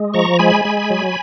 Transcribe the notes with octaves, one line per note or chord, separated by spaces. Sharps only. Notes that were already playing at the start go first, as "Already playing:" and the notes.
Already playing: G#3
F3 A#5 C#6
G#3 G#5 B5
G#3
F#3